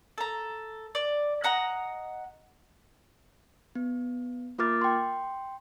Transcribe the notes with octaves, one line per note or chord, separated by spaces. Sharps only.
A4 A#5
D5
D#5 F#5 A#5
B3
A#3 F4 A#4 D6 F6 A6
G5 C6